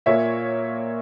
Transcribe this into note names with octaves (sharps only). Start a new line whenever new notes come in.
A#2 A#3 C#5 E5